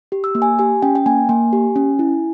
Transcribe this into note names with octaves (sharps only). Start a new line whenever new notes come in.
G4
E6
A#3
G#5
G4 G#5
C#4 G5
G5
A#3 G#5
A#3 G#5
G4
C#4
E4